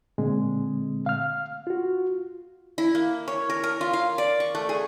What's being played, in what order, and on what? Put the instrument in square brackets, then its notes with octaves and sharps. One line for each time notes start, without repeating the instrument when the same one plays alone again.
[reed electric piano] A#2 D3 G#3 C4
F5 F6
F4 F#4
[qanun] E4
A#3
C#5
A#4
A#4
F4
F5
D5
C#6
A3
G#4